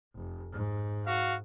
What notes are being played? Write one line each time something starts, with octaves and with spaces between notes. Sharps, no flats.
F1
G#2
F#4 F5